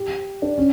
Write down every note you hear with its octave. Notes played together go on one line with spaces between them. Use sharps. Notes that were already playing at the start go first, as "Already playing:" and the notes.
Already playing: G4
D4
C#4